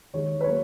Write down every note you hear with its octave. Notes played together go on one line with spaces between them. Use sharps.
D#2 D#3 G#3 C#5
B4
F#3 A#3 C#5